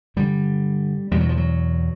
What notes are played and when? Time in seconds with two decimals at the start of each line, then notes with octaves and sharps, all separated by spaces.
0.16 G2 D3 G3
1.11 E2 B2 G3
1.20 F#3
1.29 F3
1.37 F#3